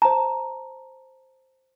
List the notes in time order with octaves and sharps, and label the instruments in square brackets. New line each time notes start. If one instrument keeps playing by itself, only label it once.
[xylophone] C5 A5 [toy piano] A#5